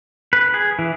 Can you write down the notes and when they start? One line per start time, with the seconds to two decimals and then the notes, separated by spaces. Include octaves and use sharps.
0.33 B4
0.54 G#4
0.79 E3